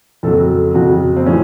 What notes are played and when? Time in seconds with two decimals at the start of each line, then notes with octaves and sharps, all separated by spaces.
0.23 F2 C#3 F#3 A4
0.36 F#4
0.51 A4
0.74 F2 C#3 F#3 F#4
1.16 C4
1.26 A2 F3 C#4